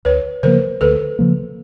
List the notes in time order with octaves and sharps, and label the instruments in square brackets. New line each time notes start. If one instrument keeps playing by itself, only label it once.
[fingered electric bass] D2 [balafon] B4 C#5
[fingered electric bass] C#3 F3 A#3 [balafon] A#4 C5
[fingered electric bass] D2 [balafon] A4 B4
[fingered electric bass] C#3 F3 A#3